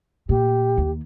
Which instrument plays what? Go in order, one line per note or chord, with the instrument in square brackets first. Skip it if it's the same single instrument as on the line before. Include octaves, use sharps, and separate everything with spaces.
[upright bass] A#2 [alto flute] G4
[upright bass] D#2